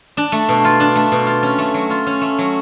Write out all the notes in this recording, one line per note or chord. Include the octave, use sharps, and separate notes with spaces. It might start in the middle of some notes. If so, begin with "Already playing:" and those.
D4
A3
B2
F4
D4
A3
B2
F4
C#4
A3
F#3
F4
C#4
A3
F#3